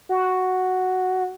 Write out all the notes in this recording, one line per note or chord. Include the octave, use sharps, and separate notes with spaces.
F#4